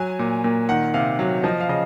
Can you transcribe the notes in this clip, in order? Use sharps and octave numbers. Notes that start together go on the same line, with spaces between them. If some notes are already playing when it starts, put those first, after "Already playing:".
Already playing: F#3 G#5
A#2
A#2
D#3 F#5
C3 F5
F#3
F3 D#5
F5
C#3 D#5